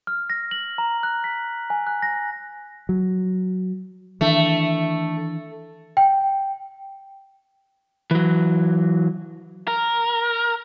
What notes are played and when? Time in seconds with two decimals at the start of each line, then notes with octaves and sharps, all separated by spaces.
0.07 F6
0.30 A#6
0.51 F#7
0.78 A#5
1.03 F#6
1.24 B6
1.70 G#5
1.87 F#6
2.03 A#6
2.89 F#3
4.21 D#3 E3 A3 D4
5.97 G5
8.11 E3 F#3
9.68 A#4